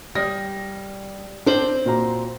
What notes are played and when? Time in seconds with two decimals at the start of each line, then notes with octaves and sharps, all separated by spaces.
0.15 G3 D#6 F6 A#6
1.46 C4 D4 C5 F#7
1.86 A#2 F#4 A#5